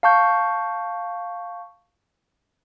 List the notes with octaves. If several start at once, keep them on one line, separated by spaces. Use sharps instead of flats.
F5 A5 C#6 G6